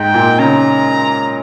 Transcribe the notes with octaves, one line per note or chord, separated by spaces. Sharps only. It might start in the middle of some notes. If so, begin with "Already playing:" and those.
Already playing: G#2 G5
A#2
C#3 A#5